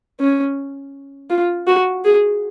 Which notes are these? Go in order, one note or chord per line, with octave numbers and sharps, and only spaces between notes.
C#4
F4
F#4
G#4